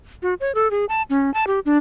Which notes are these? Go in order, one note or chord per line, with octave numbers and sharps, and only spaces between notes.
F#4
C#5
A4
G#4
A5
C#4
A5
G4
D4